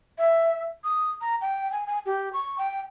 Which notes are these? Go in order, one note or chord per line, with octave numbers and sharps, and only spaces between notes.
E5
D#6
A#5
G5
G#5
G#5
G4
C#6
G5